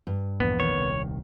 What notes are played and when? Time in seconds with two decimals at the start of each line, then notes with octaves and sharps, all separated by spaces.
0.07 G2
0.40 A#1 E2 B3
0.60 D#3 C#5
0.75 D#1 C2